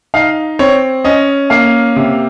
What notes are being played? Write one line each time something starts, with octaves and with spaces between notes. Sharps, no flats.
D#4 F5
C4 C#5
C#4 D#5
A#3 F5
C3